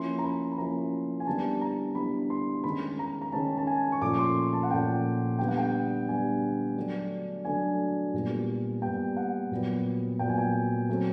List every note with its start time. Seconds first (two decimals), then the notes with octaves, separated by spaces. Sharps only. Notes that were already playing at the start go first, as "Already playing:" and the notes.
Already playing: F3 A#3 C#4 E4 C6
0.19 A#5
0.24 B5
0.52 B5
0.58 F3 A#3 C#4 E4 A#5
1.20 G#5
1.27 D3 G3 B3 E4 A5
1.61 A#5
1.95 D3 G3 B3 E4 B5
2.30 C6
2.64 D#3 G#3 C#4 B5
2.99 A#5
3.21 A#5
3.32 D#3 G#3 C#4 A5
3.58 A5
3.67 G#5
3.92 C#6
4.02 A#2 F3 A3 C#4 D6
4.19 C6
4.53 A5
4.63 F#5
4.70 A#2 F3 A3 C#4 G5
5.39 D3 G3 B3 G5
5.48 F#5
5.57 G5
6.08 D3 G3 B3 G#5
6.76 D3 F#3 A3 D4
7.45 D3 F#3 A3 D4 G#5
8.14 A#2 G3 B3
8.82 A#2 G3 B3 G5
9.17 F#5
9.51 A#2 F#3 B3
10.19 A#2 F#3 B3 G5
10.29 G#5
10.38 G5
10.89 F#3 A3 C4